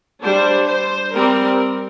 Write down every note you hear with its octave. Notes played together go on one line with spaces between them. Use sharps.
G3 D4 C5
C5
G3 C4 A#4